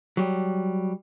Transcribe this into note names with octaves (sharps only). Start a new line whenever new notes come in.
F#3 G3